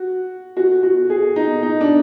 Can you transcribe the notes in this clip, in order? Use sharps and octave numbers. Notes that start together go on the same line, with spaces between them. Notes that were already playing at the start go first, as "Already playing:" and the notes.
Already playing: F#4
F#4
F#4
G#4
D#4
D#4
D4